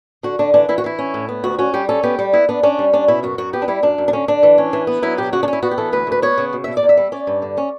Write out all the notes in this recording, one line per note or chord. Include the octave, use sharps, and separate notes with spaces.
D3 F#4
D3 D4
E3 D4
E3 E4
F#4
E3 E4
C#4
A2
B3
D2 F#4
C#4 F#4
G3 G4
C#4 A4
B3 G4
G3
B3 E4
B3 D4
C#4 D4
G3
C#4 D4
B2 E4
F#2 F#4
F#2 F#4
B3 G4
D4
G3 E4
F#2 D4
F#2
D4
D3 C#4
D3 D4
E3
C#4
E3
B3
F#3 E4
B2 G4
C#3 F#4
D4
C#4
E4
B3 F#4
G4
E3 A4
D2 B4
D2 B4
B3 C#5
C#3
B2
B2 E5
D5
E2
E5
G3
C#4 D5
G2
D3
C#4